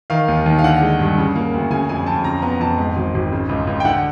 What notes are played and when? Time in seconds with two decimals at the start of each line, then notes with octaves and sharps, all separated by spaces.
0.10 D#3 F5
0.28 D#2
0.46 D#2
0.59 F5
0.64 D3 F#5
0.82 G#3
0.99 G2
1.18 C#3
1.35 A#3
1.54 D2
1.70 C#3 G#5
1.89 F2 G#5
2.06 F2 A5
2.24 C#3 A#5
2.42 B3 A#5
2.60 F2 A5
2.78 G#2
2.96 G#1
3.14 G#1
3.32 C#3
3.49 C#2
3.67 C#2
3.80 G5
3.85 D3 F#5